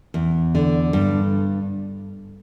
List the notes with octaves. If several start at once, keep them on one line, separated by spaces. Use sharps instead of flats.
E2
D3
G2